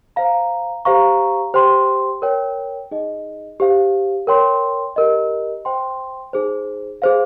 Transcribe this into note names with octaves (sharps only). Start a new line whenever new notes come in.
C5 F5 A#5
G4 C5 F5 A#5 C#6
G4 C5 G5 C6
A#4 C#5 G5
D#4 G#4 D#5
G4 C5 F5
A#4 C#5 G5 C6
G4 A#4 D#5
C5 G5 C6
D#4 G#4 C5
G#4 C5 F5